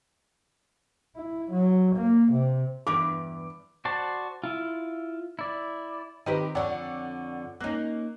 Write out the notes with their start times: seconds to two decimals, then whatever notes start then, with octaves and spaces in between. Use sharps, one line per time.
1.16 E4
1.51 F#3
1.95 A#3
2.32 C3
2.87 E2 G2 D6
3.85 F#4 C5 D5 A5
4.44 E4 F4
5.39 E4 D5
6.26 D#3 C4 G4 B4 D#5
6.55 F2 D3 C#5 D5 F#5
7.61 A#3 C#4 D#4 F#6